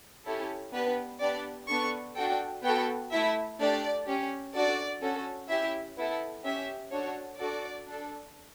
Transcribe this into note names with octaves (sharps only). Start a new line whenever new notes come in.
C#4 E4 G4 A4
B3 D4 G4 B4
B3 D4 G4 D5
B3 D4 A4 C#6
D4 F#4 A4 G5
B3 F#4 A4 G5
A3 E4 A4 E5
A3 D4 G4 D5
C#4 G4
D4 F#4 A4 D5
C#4 F#4 A4
C#4 E4 G4 E5
B3 E4 A4
C#4 G4 E5
D4 F#4 A4 C#5
D4 F#4 A4 D5
D4 A4